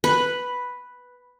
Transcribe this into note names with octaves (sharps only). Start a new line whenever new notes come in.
B4